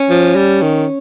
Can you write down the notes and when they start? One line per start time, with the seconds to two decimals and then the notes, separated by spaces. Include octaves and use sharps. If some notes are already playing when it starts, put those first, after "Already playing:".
Already playing: C#4
0.10 F3
0.35 G3
0.62 D#3